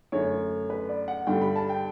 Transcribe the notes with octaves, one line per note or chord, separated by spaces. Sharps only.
F#2 D3 A3 C#5
B4
D5
F#5
G2 D3 G3 G5
B5
A5
G5